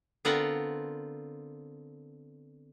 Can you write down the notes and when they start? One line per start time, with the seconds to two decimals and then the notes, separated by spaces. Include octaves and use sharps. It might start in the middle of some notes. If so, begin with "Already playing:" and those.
0.25 D3 B3 C4 F4 A#4 F#5